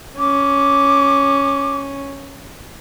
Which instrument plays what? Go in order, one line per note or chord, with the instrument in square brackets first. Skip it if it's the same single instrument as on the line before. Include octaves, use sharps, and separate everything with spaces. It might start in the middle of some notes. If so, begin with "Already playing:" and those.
[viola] C#4 [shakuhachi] D6